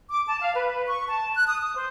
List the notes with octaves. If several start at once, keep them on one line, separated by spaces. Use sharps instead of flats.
D6
A5
F5
B4
C#6
A5
F#6
D#6
D#6
C5